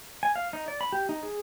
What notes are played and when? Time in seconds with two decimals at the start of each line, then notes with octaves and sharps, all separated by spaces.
0.23 G#5
0.35 F5
0.53 D#4
0.68 D5
0.81 B5
0.93 G4
1.09 D#4
1.23 G#4